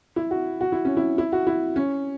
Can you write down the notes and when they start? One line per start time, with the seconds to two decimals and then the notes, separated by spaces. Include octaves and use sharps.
0.16 E4
0.31 F#4
0.61 F#4
0.72 E4
0.85 C#4
0.97 E4
1.18 E4
1.32 F#4
1.47 E4
1.76 C#4